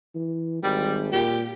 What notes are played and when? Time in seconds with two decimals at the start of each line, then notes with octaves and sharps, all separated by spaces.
0.15 E3
0.63 G#1 G3
1.12 A#2 G4